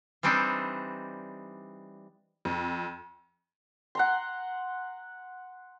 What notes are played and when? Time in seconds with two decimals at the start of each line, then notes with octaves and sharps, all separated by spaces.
0.23 E3 G3 C4 D4 D#4
2.45 F2
3.95 F#5 A#5 C6